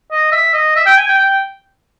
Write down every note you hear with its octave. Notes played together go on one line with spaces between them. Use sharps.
D#5
E5
D#5
E5
G5
G#5
G5
G5